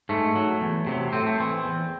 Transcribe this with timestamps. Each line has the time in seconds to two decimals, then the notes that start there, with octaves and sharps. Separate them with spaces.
0.09 G#2 A3
0.36 F#3
0.62 E2
0.87 C3 D#3 F#3
1.13 A2 C4
1.26 A3
1.38 E3 C4
1.64 E2